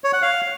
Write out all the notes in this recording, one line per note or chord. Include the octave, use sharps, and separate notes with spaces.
C#5
F#5
F5